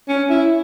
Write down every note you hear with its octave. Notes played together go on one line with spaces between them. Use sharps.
C#4
E4